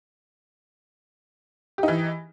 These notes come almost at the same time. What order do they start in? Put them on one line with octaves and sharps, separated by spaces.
G4 D#4 E3